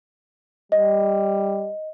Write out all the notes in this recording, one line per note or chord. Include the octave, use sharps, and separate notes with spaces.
G3 D#5